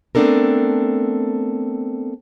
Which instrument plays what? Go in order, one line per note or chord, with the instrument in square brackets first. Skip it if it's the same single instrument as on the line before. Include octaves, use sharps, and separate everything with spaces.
[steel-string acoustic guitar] A3 B3 C4 D4 A4 A#4